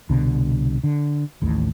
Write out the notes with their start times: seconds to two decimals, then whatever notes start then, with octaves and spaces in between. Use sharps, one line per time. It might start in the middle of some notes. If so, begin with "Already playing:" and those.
0.09 C2 B2 D3
0.84 D3
1.42 A1 D#2 A2